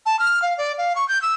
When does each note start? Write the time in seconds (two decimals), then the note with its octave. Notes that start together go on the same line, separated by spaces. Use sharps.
0.06 A5
0.19 F6
0.42 F5
0.58 D5
0.78 F5
0.96 C#6
1.08 G6
1.22 E6